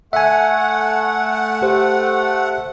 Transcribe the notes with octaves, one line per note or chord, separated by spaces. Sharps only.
A3 E5 F#5 G#5
G4 C5